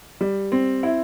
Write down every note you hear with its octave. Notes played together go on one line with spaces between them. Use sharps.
G3
C4
E4